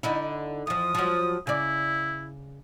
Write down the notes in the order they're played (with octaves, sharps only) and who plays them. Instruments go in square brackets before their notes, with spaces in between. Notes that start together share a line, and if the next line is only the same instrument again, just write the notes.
[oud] D3 D#4 E4
[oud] E2 F3 [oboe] D#6
[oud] F3 F#3
[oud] C#3 D5 [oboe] E4